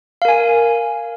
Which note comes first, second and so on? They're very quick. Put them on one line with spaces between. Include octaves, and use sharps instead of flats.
F5 A#4 G#5